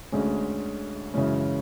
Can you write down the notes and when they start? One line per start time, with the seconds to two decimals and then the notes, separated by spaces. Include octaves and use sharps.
0.12 D2 D3 G#3 C#4 G#4
1.14 F#2 C#3 E3 G#3 C#4